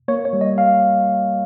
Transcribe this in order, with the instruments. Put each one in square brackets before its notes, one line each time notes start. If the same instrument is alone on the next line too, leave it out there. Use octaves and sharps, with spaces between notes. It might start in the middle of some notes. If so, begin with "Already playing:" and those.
[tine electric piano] A#3 C#5
C#5
G3
D#5
F5